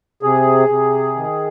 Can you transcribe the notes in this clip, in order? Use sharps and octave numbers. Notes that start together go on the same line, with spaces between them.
C3 G#4
C3
D#3